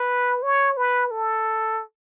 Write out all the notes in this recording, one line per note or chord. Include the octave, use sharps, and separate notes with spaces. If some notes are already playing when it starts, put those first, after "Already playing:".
Already playing: B4
C#5
B4
A4